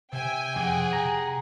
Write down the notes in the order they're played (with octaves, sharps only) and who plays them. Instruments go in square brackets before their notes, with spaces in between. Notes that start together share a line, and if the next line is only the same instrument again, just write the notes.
[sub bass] C3 [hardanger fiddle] E5 [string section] G5 G#5
[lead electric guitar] F2 [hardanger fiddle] G#4 F#5
[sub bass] C3 [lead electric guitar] A#5